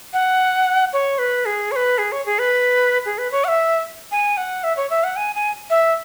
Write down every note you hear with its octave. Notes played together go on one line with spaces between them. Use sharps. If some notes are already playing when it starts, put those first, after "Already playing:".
F#5
C#5
B4
G#4
C#5
B4
G#4
C#5
G#4
B4
G#4
B4
C#5
F#5
E5
G#5
F#5
E5
C#5
E5
F#5
G#5
G#5
E5